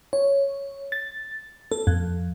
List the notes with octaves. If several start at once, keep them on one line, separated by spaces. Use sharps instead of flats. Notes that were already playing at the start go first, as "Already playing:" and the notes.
C#5
A6
A4
F2